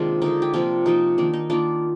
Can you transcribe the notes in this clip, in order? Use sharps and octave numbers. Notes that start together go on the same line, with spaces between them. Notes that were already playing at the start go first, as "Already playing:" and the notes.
Already playing: C3 D#3 G#3 A#3 D4 F4
D3 G#3 D#4
G4
C3 F3 A#3 D4 F4
C3 F3 A#3 D#4
D#3 A#3 D4
D#4
D#3 A#3 D4 F4